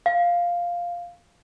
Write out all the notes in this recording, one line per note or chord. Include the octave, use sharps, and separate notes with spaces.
F5